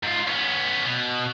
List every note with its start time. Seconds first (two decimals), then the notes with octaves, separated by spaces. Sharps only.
0.03 G#2 F4
0.27 B3 C#4
0.85 B2